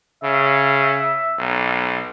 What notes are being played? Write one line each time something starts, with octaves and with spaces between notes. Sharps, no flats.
C#3 E5
B1